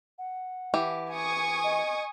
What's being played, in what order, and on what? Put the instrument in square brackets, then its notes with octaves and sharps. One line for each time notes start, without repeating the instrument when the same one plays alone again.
[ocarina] F#5
[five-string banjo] E3 G4
[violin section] G#5 C#6 D#6
[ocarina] D#5